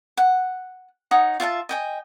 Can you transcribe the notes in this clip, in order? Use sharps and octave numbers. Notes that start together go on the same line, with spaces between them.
F#5
D#4 C#5 F#5 D#6
F4 E5 F5 A5
D#5 G5 G#5